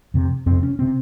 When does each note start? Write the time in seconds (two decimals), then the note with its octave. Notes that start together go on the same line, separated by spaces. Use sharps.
0.14 F2 C3
0.46 F2 C3 C4
0.63 C#4
0.79 C3 C4